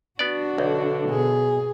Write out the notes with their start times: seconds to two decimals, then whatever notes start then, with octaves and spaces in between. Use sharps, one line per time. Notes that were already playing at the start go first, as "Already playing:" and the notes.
0.19 B3 D4 F#4 D5
0.58 B1 D3
1.10 B2 G#4